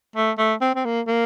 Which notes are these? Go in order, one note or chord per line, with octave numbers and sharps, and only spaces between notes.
A3
A3
C4
C4
A#3
A#3